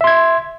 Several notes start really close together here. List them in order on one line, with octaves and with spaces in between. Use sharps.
E5 C6 G#6